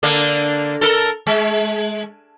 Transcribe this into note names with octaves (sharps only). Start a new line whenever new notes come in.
D3 A#3 D4
A4 A#4
G#3